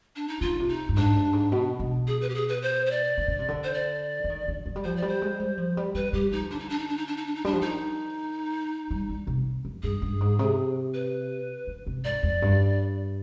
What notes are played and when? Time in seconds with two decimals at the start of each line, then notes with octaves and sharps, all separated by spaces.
0.16 D4
0.28 D#4
0.41 D#3 F4
0.55 D3
0.60 C3
0.69 D#4
0.89 G2
0.96 G#2 D4
1.15 G2
1.33 G#2
1.52 B2
1.79 B2
2.07 G#4
2.21 B4
2.29 G4
2.34 G#4
2.49 B4
2.62 C5
2.86 C5
2.91 D5
3.18 D#3
3.28 D3
3.39 C3
3.49 D3
3.64 C5
3.74 D5
4.24 F3
4.29 D#3
4.48 D3
4.66 F3
4.76 G3
4.84 F3 C5
4.96 D5
5.02 G3
5.08 C5
5.22 G#3
5.40 G3
5.58 F3
5.77 G3
5.95 G3 B4
6.13 G3 G4
6.32 F3 D#4
6.50 D3 D4
6.59 D#4
6.69 D4
6.79 D#4
6.88 D4
6.97 D#4
7.07 D4
7.17 D#4
7.26 D4
7.35 D#4
7.45 G3 D4
7.53 F3
7.61 D#3 D#4
8.91 G3
9.09 G3
9.27 C3
9.65 F2
9.83 G2 G#4
10.02 G2
10.21 G#2
10.39 C3
10.94 B4
11.67 D3
11.87 C3
12.04 G#2 D5
12.23 F2
12.42 G2